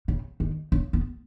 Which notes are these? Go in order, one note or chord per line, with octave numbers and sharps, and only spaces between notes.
C#3
D#3
C#3
B3